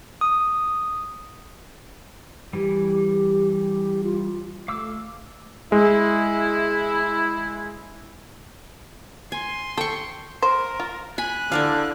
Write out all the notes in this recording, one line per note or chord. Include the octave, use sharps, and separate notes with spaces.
D#6
E3 G3 G4
F4
A3 F5 D6 E6
G#3 E4
G#5 C6
A4 G5 C#6
A#4 C5
F4
G#5 B5 F#6
D3 E4 D5 F5